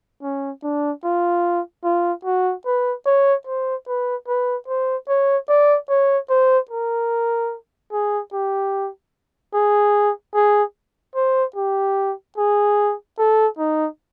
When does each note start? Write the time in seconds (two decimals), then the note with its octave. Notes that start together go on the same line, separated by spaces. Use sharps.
0.23 C#4
0.63 D4
1.04 F4
1.84 F4
2.25 F#4
2.66 B4
3.06 C#5
3.47 C5
3.88 B4
4.28 B4
4.68 C5
5.09 C#5
5.49 D5
5.90 C#5
6.30 C5
6.71 A#4
7.92 G#4
8.33 G4
9.54 G#4
10.35 G#4
11.16 C5
11.56 G4
12.38 G#4
13.19 A4
13.59 D#4